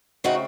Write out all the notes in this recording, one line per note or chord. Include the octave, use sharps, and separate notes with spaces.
C#3 A3 C4 D#4 F#4